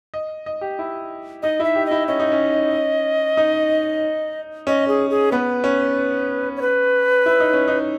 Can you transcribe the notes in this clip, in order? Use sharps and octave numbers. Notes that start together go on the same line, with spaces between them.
D#5
D#5
G4
E4
D#4 D#5
E4 E5
G4
E4 D#5
C#4 D#5
D#4
C#4
D#4
C#4 D#5
G#4
G#4
B3 B4
C#4
C#5
B4
E4
D#4
C#4
D#4